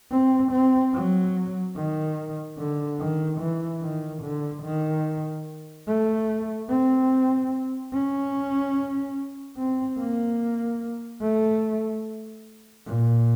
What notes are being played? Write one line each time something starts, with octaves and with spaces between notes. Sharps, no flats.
C4
C4
F#3
D#3
D3
D#3
E3
D#3
D3
D#3
A3
C4
C#4
C4
A#3
A3
A#2